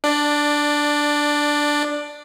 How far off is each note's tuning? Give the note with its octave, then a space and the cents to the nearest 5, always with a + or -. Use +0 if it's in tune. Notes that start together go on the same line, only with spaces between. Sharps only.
D4 +0 D5 +15